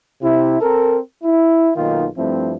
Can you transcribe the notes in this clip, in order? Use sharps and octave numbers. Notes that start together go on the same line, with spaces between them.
C3 E4
C4 A4 A#4
E4
B1 D#3 A#3 D#4 F4
G2 F3 A3 C4 E4